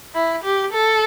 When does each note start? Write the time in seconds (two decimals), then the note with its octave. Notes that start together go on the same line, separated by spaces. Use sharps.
0.15 E4
0.44 G4
0.73 A4